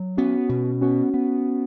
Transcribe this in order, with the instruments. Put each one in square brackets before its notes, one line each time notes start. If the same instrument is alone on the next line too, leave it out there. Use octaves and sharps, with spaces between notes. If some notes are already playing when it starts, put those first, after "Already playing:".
Already playing: [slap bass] F#3
[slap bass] B3 [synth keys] C#4 F#4
[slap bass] B2
[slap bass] B3 [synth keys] C#4 F#4
[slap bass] B3